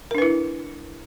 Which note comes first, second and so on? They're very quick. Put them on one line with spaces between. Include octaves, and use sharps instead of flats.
A#4 D4 B4 E4